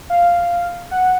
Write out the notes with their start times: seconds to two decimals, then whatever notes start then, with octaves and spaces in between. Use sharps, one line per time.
0.10 F5
0.91 F#5